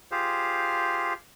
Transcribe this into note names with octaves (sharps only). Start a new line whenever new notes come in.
F4 G4 G#4 C5 F5